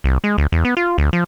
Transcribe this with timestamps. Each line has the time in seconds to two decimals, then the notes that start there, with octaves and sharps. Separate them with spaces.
0.04 C2
0.24 G#3
0.38 D2
0.52 E2
0.65 B3
0.77 F4
0.98 D2
1.13 F3